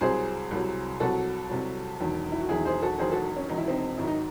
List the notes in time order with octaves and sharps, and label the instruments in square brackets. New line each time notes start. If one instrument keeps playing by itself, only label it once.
[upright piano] C2 C3 F#3 G#4 C5
C2 C3 F#3
C2 C3 F#3 F#4 A4
C2 C3 F#3
E1 E2 D#3 F#3
E4
F#4
E1 E2 D#3 F#3 E4 G#4
G#4 C5
F#4 A4
E1 E2 D#3 F#3 G#4 C5
F#4 A4
C#4
E1 E2 D#3 F#3 D#4
E4
C4 D#4
G#1 G#2 D#3 F#3 E4
D#4